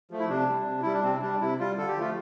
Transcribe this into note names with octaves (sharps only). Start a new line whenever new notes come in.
F3 A3
E4
C3 D4
G3
C3
G3 E4
D4
C3 C4
G3 D4
C3 E4
G3 F4
D3 A4
G4
F3 A3 F4